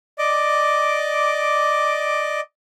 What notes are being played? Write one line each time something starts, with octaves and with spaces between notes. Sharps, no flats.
D5 D#5 D6